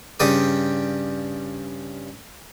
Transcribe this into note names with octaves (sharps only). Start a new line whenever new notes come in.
G2 C#3 D5 G5 D#6